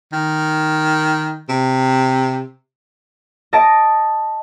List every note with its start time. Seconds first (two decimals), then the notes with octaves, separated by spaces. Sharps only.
0.13 D#3
1.49 C3
3.53 D#5 A5 A#6 D7